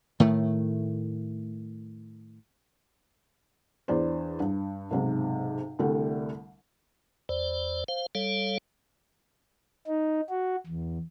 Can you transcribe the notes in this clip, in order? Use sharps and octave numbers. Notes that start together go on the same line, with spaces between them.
A2 D#3 A3
E2 D4 C5
G2
B1 G#2 C3
C2 D3 G3 A3
E2 C5 D5
C5 F5
G3 A4 C#5 F5
D#4
F#4
E2